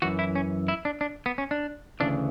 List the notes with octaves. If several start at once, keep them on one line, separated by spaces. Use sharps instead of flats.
F#2 E3 F#4
E4
C#4
E4
D4
D4
B3
C#4
D4
D2 C#3 E3 D4